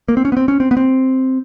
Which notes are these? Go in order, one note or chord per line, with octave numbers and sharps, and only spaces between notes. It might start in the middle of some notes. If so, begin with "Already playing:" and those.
A#3
C4
C#4
B3
C4
C#4
C4
B3
C4